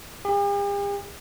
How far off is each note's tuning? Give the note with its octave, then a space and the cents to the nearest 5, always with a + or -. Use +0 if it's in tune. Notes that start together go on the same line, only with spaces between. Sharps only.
G4 +45